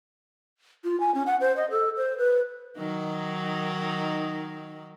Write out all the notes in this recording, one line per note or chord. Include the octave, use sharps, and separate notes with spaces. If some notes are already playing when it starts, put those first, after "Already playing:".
F4
G#5
C#4
F#5
C5
D#5
A4
C5
B4
D#3 F#3 D#4